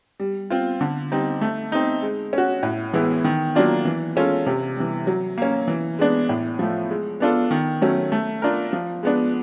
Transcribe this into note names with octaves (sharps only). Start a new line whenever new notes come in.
G3
C4 F4
D3
G3 C4 D#4
A3
C4 D#4
G#3
C#4 F#4
A2
E3 G#3 B3 E4
D#3
F#3 A#3 D4 F4
E3
G#3 C#4 F4 A4
C3
E3 G3
F#3
A#3 C#4
E3
G#3 B3 D4
A2
F3 A3
G#3
B3 D4 F4 A4
D#3
F#3 A3 C#4
A3
D4 F4 A#4
F3
G#3 B3 D4